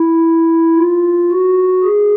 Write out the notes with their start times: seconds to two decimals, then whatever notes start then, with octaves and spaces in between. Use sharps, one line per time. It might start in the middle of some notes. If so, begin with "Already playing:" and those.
Already playing: E4
0.77 F4
1.31 F#4
1.84 G#4